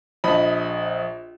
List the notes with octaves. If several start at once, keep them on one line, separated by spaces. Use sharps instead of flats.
A#1 D#5 B5